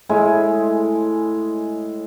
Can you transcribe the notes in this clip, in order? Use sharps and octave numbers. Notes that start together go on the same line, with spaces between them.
A2 G#3 G#5 B5